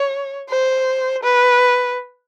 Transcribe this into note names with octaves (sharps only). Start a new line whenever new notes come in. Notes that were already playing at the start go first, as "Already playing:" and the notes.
Already playing: C#5
C5
B4